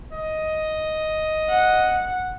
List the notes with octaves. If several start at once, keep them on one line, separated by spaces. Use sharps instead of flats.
D#5
F#5